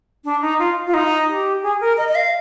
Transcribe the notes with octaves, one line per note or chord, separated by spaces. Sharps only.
D4
D#4
F4
F4
D#4
G4
G#4
A#4
D#5
D#5
F5